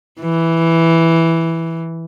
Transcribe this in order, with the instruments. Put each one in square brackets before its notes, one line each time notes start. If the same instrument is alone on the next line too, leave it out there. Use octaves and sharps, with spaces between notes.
[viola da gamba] E3